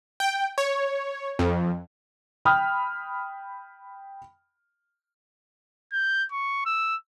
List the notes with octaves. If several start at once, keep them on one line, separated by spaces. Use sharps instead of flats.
G5
C#5
F2
G5 B5 D#6 F6
G6
C#6
E6